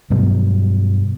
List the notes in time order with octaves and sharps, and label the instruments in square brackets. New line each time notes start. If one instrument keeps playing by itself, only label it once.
[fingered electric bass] G2 B2 F#3